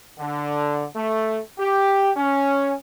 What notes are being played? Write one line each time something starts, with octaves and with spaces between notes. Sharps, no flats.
D3
A3
G4
C#4